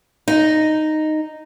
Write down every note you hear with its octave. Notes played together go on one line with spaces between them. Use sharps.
D#4